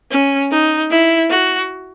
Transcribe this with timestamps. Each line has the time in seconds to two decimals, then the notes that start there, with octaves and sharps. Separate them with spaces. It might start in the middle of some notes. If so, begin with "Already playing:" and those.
0.11 C#4
0.51 D#4
0.91 E4
1.30 F#4